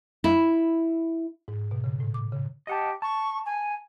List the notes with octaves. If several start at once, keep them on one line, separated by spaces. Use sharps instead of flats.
E4
G#2
B2
C#3
A2
D6
C#3
G4 D#5 F#5 A5
A5 C#6
G#5